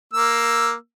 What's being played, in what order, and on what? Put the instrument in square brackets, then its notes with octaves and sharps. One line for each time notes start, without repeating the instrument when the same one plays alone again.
[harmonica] A#3 E6